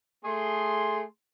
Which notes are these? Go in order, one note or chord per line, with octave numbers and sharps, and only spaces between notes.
A3 G#4 C6